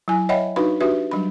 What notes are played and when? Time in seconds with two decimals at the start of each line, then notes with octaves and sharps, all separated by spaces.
0.08 F#3 E4 G#5
0.29 C#5 D#5 E5 F#5 G5 B5
0.56 D4 D#4 F#4 B4 F5 B5
0.80 D4 F#4 G4 B4 E5
1.11 F#3 G3 D4 B5